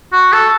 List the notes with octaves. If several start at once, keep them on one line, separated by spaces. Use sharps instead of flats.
F#4
A4